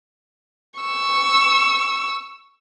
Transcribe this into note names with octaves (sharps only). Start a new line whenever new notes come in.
C#6 E6